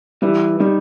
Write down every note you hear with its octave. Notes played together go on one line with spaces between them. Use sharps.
E3 G3
D#3 G3